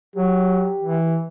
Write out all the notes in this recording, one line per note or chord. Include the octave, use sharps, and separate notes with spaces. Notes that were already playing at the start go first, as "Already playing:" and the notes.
F#3 G4
E3